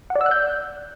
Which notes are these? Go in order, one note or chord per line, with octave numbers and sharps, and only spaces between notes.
F#5
D5
E6
F#6
G6